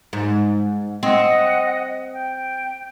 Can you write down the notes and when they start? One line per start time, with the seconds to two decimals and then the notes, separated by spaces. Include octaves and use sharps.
0.13 G#2
1.03 C4 D#5 F#5
2.13 G5